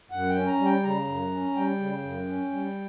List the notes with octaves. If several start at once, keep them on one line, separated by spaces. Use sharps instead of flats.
F#2 F#5
G5
C#4
A#5
G3
G5
C#3 A#5
F#2
C#4
G3 G5
C#3
F#2
C#4
G3